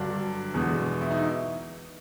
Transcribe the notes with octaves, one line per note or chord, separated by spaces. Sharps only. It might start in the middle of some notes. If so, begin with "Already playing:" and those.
Already playing: G2 D3 F#3 D4
E2 B2 G#3 B3
E4
D#4